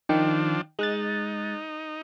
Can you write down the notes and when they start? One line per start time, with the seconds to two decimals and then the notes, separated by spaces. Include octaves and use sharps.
0.09 D#3 F3 D4 D#4 G5
0.79 G#3 D#4 F#6 A6